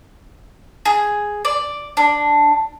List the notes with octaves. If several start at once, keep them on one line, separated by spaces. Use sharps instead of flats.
G#4
D5
D4